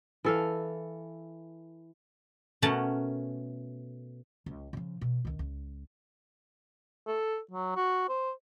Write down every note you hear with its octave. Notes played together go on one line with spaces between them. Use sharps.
E3 A4 F5
B2 A3 C#4 A#4 F#5 A5
C#2
C#3 F3
B2
C#2 D#3
C#2
A4
F#3
F#4
C5